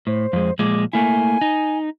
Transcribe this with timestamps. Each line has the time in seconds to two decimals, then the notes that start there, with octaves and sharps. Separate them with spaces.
0.07 A2 C5
0.33 F2 G#3
0.59 A#2 F3 G#3 D6
0.93 A3 A#3 E4 G#5
1.41 D#4